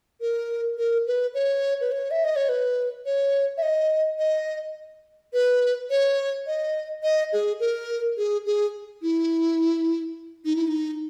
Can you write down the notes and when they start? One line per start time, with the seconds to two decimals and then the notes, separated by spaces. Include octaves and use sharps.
0.21 A#4
0.78 A#4
1.07 B4
1.34 C#5
1.81 B4
1.92 C#5
2.11 E5
2.24 D#5
2.36 C#5
2.49 B4
3.06 C#5
3.57 E5
3.62 D#5
4.19 D#5
5.34 B4
5.90 C#5
6.47 D#5
7.03 D#5
7.33 G#4
7.60 A#4
8.17 G#4
8.46 G#4
9.02 E4
10.45 D#4
10.56 E4
10.67 D#4